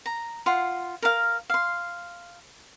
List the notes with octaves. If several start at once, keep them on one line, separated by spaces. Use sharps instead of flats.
A#5
F4 F#5 C6
A#4 F5
F5 C6